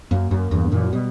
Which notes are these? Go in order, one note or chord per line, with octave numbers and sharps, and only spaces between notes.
F#2 A#3
F#2
E2 G2
D3
F#2 A#2 E3
F#3
B2 G3